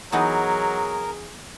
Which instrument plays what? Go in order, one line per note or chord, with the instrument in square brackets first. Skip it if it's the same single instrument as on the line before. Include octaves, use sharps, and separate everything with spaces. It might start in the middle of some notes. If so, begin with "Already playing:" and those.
[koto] E3 B3 D#4 [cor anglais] F#3 [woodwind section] G#4 [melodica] A#4